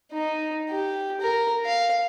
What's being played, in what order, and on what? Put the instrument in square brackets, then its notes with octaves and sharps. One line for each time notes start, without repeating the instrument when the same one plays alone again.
[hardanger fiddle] D#4
G4
A#4
F5